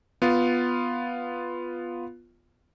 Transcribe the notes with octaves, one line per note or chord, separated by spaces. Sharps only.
B3 F4